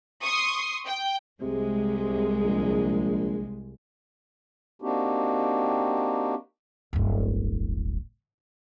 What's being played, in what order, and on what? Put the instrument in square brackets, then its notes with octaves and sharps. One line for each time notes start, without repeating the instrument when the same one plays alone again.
[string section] C6 C#6 D#6
G5
[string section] C2 G#3 [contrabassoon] C3
[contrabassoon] A#1
[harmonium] A#3 C4 D4 D#4 F#4 G4
[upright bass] D1 G1